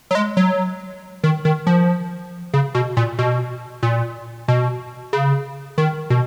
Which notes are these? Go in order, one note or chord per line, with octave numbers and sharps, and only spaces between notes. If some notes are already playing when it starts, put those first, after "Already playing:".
F#3
G#3
F#3
D#3
D#3
F3
C#3
B2
A#2
B2
A#2
B2
C#3
D#3
B2